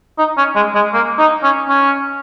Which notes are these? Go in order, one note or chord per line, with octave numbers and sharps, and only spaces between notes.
D#4
C#4
G#3
G#3
A#3
D#4
C#4
C#4